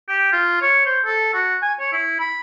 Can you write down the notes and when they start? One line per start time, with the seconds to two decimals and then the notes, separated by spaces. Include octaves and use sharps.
0.08 G4
0.32 F4
0.62 C#5
0.86 C5
1.05 A4
1.34 F#4
1.62 G#5
1.79 C#5
1.93 E4
2.20 B5